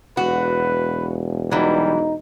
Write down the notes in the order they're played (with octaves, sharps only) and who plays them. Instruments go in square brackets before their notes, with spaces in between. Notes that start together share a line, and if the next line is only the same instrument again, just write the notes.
[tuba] E1 [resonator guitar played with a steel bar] F#4 [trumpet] B4
[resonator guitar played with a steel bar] E3 F#3 [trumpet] G3 [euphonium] D#4